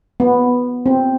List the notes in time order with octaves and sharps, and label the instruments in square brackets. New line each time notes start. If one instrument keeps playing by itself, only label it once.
[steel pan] B3
C4